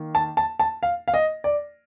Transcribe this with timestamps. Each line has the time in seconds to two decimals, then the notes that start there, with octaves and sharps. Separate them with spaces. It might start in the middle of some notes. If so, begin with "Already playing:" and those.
Already playing: D#3 A#3
0.15 A5
0.37 A5
0.60 A5
0.83 F5
1.08 F5
1.14 D#5
1.44 D5